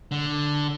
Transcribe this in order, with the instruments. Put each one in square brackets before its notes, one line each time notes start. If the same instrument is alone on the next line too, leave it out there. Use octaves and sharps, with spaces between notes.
[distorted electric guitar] D3